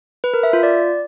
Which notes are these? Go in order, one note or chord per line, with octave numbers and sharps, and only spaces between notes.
B4
A#4
E5
F4
D5